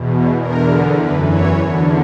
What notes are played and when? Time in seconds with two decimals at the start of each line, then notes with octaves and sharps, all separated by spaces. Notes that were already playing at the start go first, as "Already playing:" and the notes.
Already playing: E2 B2
0.40 E2 D3 A#4
1.00 F#2 E3 B4
1.29 C#5
1.58 E2 D3